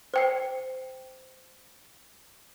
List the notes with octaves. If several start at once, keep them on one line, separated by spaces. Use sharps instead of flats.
C5 G5 C7